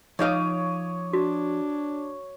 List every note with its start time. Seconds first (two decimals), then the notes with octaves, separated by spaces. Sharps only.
0.19 F3 D#4 C#5 F5 D6 D#6
1.13 D4 F#4